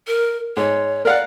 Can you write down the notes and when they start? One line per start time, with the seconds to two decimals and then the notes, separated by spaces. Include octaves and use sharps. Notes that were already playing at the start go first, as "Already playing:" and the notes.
0.07 A#4
0.57 G#2 C#5
1.05 A#4 D5 F5 F#5